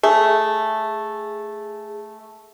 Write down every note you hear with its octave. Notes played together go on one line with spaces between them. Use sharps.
A3 G#4